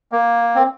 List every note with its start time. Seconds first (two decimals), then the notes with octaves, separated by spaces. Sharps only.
0.12 A#3
0.55 C4